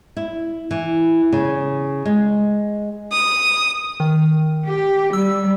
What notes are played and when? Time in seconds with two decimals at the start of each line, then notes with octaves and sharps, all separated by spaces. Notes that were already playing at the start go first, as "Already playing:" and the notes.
0.17 E4
0.71 E3
1.32 C#3
2.05 G#3
3.12 D#6
4.00 D#3
4.66 G4
5.13 G3 E6